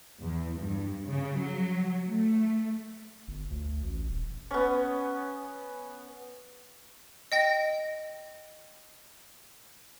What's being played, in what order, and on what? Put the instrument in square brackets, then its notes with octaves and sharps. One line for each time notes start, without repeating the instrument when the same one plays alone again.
[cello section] E2
G2
C#3
F#3
A3
[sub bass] G1
D2
A1
D#1
[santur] B3 C#4
[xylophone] D#5 G5 A#6